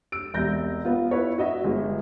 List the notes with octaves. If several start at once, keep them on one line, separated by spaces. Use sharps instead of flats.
E6 D7
E1 C2 G6 A#6
B3 F4
E4 B4 C#5
F#4 D#5 E5
G1 G#3